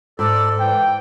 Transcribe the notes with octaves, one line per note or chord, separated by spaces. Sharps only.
G#2 A4 D5
E3 G5